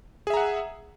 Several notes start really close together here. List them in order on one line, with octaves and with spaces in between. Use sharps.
G#4 E5 A#5 F#5